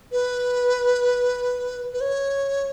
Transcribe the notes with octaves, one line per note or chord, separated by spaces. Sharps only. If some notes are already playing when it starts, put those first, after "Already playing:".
B4
B4
C#5